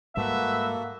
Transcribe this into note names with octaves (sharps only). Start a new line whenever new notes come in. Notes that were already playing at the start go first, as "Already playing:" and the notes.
G#2 G3 A#3 F#4 A4 B4 E5